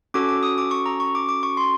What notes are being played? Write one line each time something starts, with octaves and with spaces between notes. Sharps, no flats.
C#4 F#4 A4 D6
D6
D#6
D6
C#6
A#5
C#6
D6
D6
C#6
C6